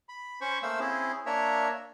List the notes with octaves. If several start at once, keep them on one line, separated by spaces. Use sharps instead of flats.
B5
C#4 C5 B5 C#6
A3 A#3 C5 F5 E6
C4 C#4 E4 G#4
A#3 D4 A#4 C#5 E5